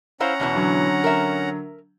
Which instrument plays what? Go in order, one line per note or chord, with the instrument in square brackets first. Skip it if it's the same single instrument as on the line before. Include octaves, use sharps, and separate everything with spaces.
[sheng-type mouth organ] C#4 F#5 A#5 [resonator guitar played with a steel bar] E4 C5 F5
[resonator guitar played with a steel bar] E2 B2 E3
[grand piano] D3 F#3
[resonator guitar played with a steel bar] A#4 E5